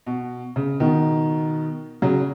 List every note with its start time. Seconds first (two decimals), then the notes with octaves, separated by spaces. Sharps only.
0.07 B2
0.56 C#3
0.80 B2 D#3
2.02 C#3 F#3